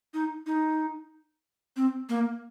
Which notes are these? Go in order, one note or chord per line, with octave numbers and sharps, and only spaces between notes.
D#4
D#4
C4
A#3